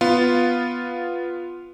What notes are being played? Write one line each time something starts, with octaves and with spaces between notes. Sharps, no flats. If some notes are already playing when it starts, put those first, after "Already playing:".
B3 F4